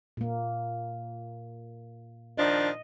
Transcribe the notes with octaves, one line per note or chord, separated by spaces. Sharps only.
A#2 A#3
D#3 F3 D4 D#5